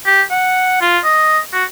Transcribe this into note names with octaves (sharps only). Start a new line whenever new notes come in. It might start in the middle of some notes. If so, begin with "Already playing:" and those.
G4
F#5
F4
D#5
F#4